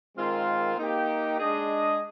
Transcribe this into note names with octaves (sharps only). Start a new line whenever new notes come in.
D#3 G#3 C4 F4 A#4
A#3 D#4 G4
G#3 D4 G#4 D#5